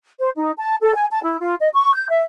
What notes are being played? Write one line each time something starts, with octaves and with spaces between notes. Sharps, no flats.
C5
D#4
A5
A4
G#5
A5
E4
F4
D#5
C#6
G6
E5